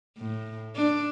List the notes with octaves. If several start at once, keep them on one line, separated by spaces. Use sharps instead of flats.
A2
D4